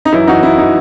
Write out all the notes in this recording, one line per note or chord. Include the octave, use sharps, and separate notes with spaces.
D#4
F#2 E3 E4
D#4 F#4
E4
E3 D#4